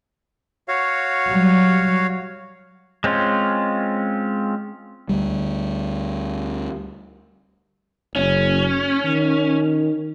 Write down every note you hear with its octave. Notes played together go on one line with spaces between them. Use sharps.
F#4 C#5 F5
F#3 G3
G#3 C4 C#4 F4
D2 G3
F#1 C#4
D#3